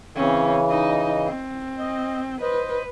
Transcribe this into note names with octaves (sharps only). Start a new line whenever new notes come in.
C#3 E3 C4 C#4
D#4 D#5
C4
D#5
B4 C5 D#5